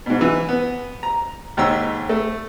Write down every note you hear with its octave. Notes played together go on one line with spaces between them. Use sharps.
G#2 B2
E3
B3
A#5
D#2 G#2 A#5 E6
A3